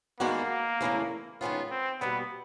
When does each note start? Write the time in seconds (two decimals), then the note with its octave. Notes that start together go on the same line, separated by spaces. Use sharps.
0.20 D#3 G#3 A#3 B3 D4 F#4
0.81 E2 C#3 E3 A3
1.41 D#3 G#3 B3 C#4 F4
1.71 C4
2.01 B2 G3 A#3 B3